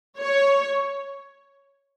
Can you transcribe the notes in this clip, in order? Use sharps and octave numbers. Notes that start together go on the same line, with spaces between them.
C#5